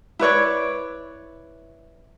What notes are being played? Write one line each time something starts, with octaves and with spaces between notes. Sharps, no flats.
E4 B4 C#5 D5